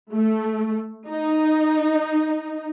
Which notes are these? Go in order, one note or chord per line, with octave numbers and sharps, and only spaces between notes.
A3
D#4